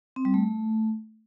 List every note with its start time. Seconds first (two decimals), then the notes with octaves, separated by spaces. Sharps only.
0.16 C4
0.25 G3
0.34 A3